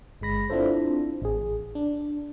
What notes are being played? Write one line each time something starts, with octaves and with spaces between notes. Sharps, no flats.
G1 G#3 B5 A#6
C4 D4 E4 F4 A4 C5
A1 G#4
D4